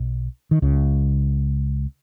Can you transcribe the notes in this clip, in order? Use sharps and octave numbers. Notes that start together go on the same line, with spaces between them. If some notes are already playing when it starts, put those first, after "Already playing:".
Already playing: B1 B2
D#3
C#2 C#3